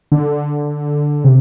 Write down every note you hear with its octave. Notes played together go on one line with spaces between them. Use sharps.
D3
C3